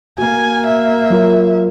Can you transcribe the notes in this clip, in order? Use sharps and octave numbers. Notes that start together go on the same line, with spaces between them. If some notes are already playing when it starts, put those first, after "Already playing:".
A#3 F#4 G#5
E5
F#3 F4 A#4